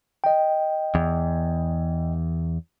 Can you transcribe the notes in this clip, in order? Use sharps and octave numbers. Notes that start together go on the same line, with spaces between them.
D#5 G5
E2